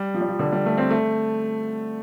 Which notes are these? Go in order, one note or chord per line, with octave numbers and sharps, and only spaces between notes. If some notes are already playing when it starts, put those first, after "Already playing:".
Already playing: G3
F3
G3
F3
D3
G3
A3
C4
A3